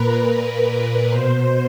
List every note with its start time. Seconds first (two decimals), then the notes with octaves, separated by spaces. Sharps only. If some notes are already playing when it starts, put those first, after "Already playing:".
Already playing: A#2 A#4 B4
0.17 B4
1.10 B2 C5